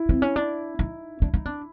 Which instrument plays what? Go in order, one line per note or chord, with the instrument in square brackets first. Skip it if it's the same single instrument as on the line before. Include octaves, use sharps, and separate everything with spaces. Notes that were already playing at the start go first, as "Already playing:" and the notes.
Already playing: [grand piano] E4
[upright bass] C4
C#4
D4
D#4
D4
D#4
D4